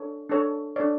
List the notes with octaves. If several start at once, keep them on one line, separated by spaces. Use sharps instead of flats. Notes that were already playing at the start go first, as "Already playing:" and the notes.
Already playing: D4 A4 C#5
D4 A4 C#5
D4 A4 C#5 D5